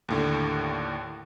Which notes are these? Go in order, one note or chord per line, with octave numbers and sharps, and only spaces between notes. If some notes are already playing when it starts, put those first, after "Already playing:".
D#2 A2 D3